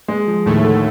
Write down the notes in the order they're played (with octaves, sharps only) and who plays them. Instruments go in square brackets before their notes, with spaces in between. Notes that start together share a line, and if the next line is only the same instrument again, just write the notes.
[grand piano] G#3
F3
[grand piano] D#2 [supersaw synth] A2 A3
[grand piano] D3